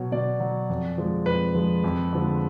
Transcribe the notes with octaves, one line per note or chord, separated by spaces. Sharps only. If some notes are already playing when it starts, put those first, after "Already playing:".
Already playing: B2 F#3 C#5
B2 D5
F#3
F2
F3 G#3
F2 B4
F3 G#3
F2
D3 F3 G#3